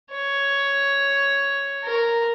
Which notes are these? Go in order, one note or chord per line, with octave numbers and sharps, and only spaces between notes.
C#5
A#4